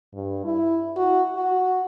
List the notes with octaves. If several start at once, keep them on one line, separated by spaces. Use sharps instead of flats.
G2
E4
F#4
F#4